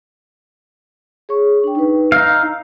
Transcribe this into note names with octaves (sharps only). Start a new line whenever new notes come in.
G#4 C#5 C#6
D4 G5
D#4 B4
D#4 F5 E6